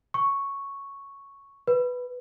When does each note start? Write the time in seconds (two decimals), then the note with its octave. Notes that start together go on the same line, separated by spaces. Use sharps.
0.14 C#6
1.67 B4